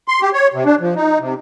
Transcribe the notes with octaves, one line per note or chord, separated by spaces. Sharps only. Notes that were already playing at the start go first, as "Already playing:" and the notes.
C6
G4
C#5
C3
D4
F3
D#4
C3